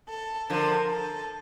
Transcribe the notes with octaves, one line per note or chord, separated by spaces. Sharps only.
A4
D3 F3 A#4
A4